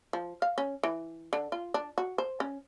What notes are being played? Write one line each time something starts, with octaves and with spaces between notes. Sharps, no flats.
F3
F5
C#4
E3
D3
F4
D4
F#4
C5
C#4